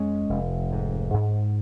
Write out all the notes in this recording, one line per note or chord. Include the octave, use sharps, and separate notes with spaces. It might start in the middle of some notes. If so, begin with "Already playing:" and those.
Already playing: F2 G#3 C#4
F1
G#2
G#2